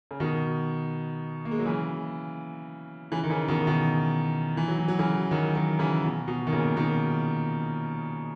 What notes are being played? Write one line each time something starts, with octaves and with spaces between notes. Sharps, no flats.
C#3
B2 D#3
A#3
G#3
F#3
C#3 E3
C#3 E3
D#3
C#3 E3
B2 D#3
B2 D#3
E3
F#3
E3
F#3
C#3 E3
D#3 F#3
D#3 F#3
C#3 E3
B2
B2
D#3
A#2 C#3
B2 D#3